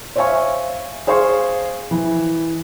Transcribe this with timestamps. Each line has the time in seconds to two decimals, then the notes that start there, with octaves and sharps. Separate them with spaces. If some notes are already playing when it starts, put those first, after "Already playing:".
0.16 C5 C#5 E5 F5 G#5 C#6
1.07 G#4 C5 F5 C6 C#6
1.91 E3